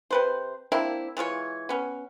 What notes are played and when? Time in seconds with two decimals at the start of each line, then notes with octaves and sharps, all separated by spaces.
0.11 C3 B4 C5
0.72 A#3 C4 D4 E4
1.17 E3 G#3 F4 C#5
1.69 B3 C#4